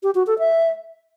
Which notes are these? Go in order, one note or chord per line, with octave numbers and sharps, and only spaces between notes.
G4
F#4
A4
E5